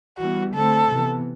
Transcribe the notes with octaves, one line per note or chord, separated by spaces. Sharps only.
E3 G3 B3 F#4
D3 A3 C4 A4
C3 E3 B3